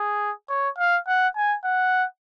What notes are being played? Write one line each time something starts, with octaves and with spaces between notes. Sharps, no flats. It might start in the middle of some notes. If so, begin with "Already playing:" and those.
Already playing: G#4
C#5
F5
F#5
G#5
F#5